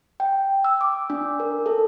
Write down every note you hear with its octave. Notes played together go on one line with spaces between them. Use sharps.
G5
E6
D6
D4
A#4
A4